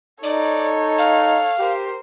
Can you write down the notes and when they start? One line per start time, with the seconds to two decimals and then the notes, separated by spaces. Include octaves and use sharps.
0.23 D#4 A4 C#5 D5
0.98 F5
1.59 G4 A#4 C5